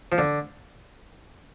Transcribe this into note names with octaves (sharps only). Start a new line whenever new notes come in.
F3
D3